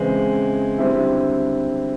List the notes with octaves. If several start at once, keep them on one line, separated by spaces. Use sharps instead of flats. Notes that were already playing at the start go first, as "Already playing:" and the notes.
Already playing: C#3 E3 G#3 C4
D3 G3 C4 E4